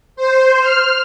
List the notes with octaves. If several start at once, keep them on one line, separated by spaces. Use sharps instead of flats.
C5
F6